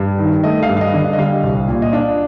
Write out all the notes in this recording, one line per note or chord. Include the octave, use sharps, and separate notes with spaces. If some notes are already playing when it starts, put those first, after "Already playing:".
Already playing: G2
D#3
A3 D#5
F5
G2
F5
D#5
D3
D#5
G3 F5
C2
A#2
D#5
D4 F5